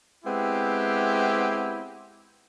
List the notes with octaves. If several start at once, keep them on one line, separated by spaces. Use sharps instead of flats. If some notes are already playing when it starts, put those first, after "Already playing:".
G#3 B3 C4 E4 G4